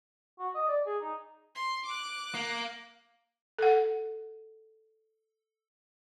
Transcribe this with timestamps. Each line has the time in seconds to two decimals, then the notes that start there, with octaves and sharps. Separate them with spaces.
0.39 F#4
0.55 D#5
0.68 D5
0.86 G#4
1.02 D#4
1.55 C6
1.86 D6 F#6
2.35 A#3
3.58 A4 F#5